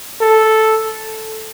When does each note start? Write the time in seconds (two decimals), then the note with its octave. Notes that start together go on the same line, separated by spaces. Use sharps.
0.21 A4